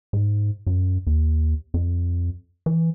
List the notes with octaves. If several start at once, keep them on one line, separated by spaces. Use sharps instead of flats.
G#2
F#2
D#2
F2
E3